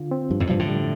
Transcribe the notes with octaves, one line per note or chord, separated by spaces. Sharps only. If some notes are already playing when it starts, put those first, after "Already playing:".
Already playing: D3 F4
C4
G2 F3
F2 A2
G2 C3 F3
A2 D3
G3